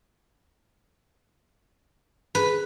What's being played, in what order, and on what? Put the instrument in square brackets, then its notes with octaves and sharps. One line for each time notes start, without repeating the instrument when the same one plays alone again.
[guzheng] B4